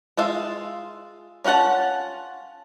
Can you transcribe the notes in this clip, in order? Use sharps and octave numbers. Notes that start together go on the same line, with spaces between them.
G#3 F4 E5 F5
C#4 F4 F#4 F#5 A5